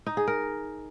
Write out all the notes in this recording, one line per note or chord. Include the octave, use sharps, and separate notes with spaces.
D#4
G#4
A#4